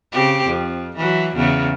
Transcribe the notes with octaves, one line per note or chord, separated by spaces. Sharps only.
C#3 C4 G4
F2
E3 F#3
E2 C#3 B3